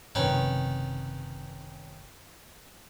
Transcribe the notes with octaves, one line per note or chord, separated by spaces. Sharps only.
F#1 C3 D#3 C#4 B4